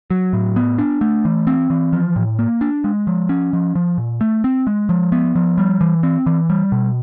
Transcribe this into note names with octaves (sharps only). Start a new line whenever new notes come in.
F#3
A2
B3
D4
A3
E3
C4
E3
F3
A2
A#3
D4
G#3
F3
C#4
F3
F3
A#2
A3
C4
G#3
F3
B3
F3
G3
E3
C4
E3
G3
B2